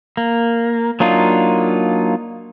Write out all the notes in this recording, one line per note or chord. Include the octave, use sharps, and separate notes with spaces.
A#3
F#3 A#3 D4 D#4 F4